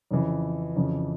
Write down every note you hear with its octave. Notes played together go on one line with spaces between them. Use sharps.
F2 C#3 E3
F2 C#3 E3